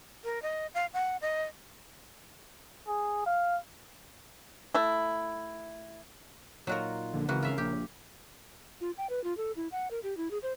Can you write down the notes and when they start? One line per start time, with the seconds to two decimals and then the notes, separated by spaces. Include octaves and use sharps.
0.24 A#4
0.42 D#5
0.74 F5
0.93 F#5
1.21 D#5
2.88 G#4
3.26 F5
4.74 A3 E4
6.67 A#2 F#3 D#4 F4 F#4 A#4
7.13 A#1 D3
7.28 G#1 C#3 E3 F#4 A#4
7.42 F4 E5 F5
7.58 A#1 G4
8.81 F4
8.98 G5
9.10 B4
9.24 F4
9.37 A4
9.56 E4
9.72 F#5
9.91 A#4
10.03 G4
10.17 E4
10.31 G#4
10.43 C5